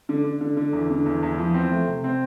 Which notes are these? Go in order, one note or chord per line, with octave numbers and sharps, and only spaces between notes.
D3
D3
D3
D3
E2
D3
E2
E2
F3
C4
A3
C3
C4